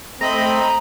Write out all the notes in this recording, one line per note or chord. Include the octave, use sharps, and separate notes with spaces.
A3 C4 D#5 A#5 B5